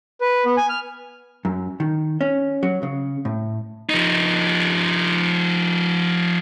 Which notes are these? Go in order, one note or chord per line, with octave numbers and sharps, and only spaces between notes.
B4
B3
G#5
F6
F#2
D#3
C#4
F#3
C#3
A2
F3 D#4